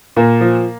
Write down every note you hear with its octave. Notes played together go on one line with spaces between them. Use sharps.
A#2 A#3
F3